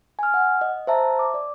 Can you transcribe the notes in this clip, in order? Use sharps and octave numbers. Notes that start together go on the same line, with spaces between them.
G#5 F6
F#5
D#5
C5 E5 A5 A#5
D6
D5